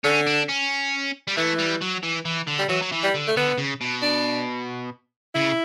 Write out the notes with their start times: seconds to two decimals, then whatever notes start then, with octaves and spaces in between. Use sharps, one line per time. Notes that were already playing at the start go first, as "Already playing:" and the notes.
0.04 D3 C#4
0.27 D4
0.49 C#4
1.28 G3
1.37 E3 A3
1.58 G3
1.81 F#3
2.03 E3
2.25 E3
2.48 D3
2.59 G3
2.69 E3 F#3
2.82 F#3
2.92 E3
3.03 G3
3.14 D3
3.28 A3
3.36 D3 B3
3.58 C#3
3.81 B2
4.02 D4
5.35 C#3 E4